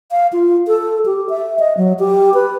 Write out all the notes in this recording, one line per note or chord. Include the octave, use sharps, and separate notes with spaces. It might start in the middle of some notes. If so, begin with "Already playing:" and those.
F5
F4
A4
G4
E5
D#5
F#3
G4
B4